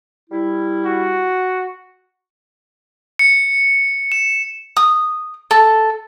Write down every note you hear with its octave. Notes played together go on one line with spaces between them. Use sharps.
G3 E4
F#4
C#7
E7
D#6
A4